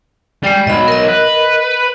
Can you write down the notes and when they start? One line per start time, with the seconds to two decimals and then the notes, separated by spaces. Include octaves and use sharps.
0.44 G3 G#3 D5 G5
0.67 B1 F#3 D#5 B5
0.88 A#4 D#5
1.08 B4